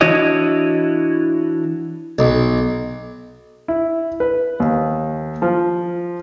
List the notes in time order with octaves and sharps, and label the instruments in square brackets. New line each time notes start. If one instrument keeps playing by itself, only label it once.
[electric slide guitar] E3 D4 E4 F#4 C#5 D#5
[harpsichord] B1
[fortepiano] E4
B4
D#2
F3